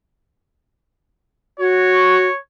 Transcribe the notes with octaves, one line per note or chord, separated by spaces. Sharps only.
F#4 C#5